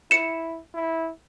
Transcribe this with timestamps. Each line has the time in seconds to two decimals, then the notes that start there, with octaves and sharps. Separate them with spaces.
0.11 E4 C#7 E7
0.75 E4